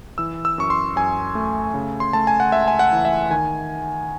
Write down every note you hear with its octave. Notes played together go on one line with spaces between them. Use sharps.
E3 E6
E6
F#2 C#6
C6
F#2 G#5
A3
C#3
C6
A3 A5
G#5
F#5
C#2 E5
G#5
F#5
E3
E5
D#3 G#5